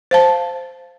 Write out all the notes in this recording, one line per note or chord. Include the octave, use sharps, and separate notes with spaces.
C5 F5 A5